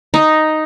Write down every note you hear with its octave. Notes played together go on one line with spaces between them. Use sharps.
D#4